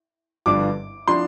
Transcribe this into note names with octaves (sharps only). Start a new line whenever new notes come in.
G1 G2 F3 D4 D6
F3 D4 C6